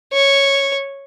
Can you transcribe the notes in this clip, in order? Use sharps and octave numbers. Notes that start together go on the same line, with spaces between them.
C#5